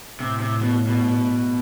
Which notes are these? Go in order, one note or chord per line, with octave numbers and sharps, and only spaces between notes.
A2 C3
C3
B2
B2